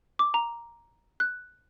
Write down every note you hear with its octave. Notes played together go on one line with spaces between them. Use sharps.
D6
A#5
F#6